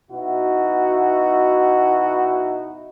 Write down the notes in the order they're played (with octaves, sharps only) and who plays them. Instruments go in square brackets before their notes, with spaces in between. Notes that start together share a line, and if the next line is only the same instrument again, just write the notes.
[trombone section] B2 D#4 E4 F#4